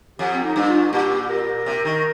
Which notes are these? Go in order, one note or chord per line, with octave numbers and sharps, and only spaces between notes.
F2 G4
C4
D#4
G2
F4
A#2 G4
G4
A#4
C3
D#3